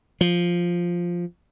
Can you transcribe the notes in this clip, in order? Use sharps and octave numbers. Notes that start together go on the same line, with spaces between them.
F3